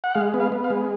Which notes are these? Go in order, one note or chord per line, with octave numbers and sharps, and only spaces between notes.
F#5
G#3 F5
B3
F5
B3
F5
G#3